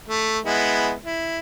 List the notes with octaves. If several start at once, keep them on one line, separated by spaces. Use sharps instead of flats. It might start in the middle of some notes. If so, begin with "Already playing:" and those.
A3
G#3 B3 E4
E4